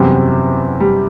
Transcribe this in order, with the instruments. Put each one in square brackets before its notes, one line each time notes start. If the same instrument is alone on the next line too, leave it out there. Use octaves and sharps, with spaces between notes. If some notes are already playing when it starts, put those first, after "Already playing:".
Already playing: [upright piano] F#1 E2 C3 F#3 C4 [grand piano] G3
[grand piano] G3